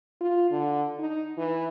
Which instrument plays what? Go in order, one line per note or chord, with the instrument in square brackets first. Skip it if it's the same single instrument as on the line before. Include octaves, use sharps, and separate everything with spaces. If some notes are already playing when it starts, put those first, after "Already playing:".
[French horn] F4
D3
D#4
E3